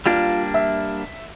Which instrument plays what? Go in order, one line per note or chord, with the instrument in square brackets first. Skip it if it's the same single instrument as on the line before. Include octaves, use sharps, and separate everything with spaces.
[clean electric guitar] G3 A#3 D4 [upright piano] F4
[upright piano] E5